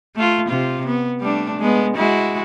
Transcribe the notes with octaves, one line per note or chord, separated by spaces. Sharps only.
A3 F4
C3 F4
B3
G3 A3 D4
G#3 B3
G#3 E4 F#4